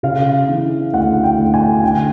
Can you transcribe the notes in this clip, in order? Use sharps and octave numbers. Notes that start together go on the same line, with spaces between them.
C#3 F5
E3
D2 F#5
G5
D2
G#5
D3 G5